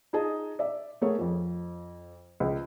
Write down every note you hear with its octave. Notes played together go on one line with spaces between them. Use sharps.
D#4 F4 G#4 D#5 A5
D5 E5
A3 G#4 A#4 C#5 F#5
F2 F3
C#2